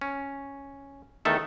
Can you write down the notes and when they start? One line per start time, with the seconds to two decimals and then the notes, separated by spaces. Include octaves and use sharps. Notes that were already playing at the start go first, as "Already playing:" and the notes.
0.01 C#4
1.25 E2 D#3 A3 A4